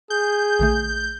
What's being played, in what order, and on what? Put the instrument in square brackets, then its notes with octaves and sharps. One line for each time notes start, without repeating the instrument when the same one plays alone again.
[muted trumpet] G#4 [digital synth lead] G6
[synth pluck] A#1 D3 A3